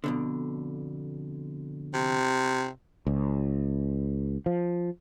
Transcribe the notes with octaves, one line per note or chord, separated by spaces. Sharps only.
F2 B2 D3
C3
C#2
F3